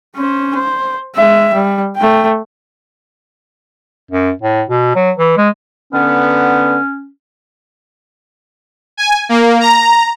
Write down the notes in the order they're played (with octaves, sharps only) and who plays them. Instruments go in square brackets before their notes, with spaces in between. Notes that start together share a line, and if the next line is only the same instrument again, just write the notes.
[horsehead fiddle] C#4 C5
C5
G#3 E5
G3
A3 G5
[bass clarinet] F#2
A2
B2
F#3
E3
G#3
[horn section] D3 B3 [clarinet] C#4
[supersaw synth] G#5
A#3
A#5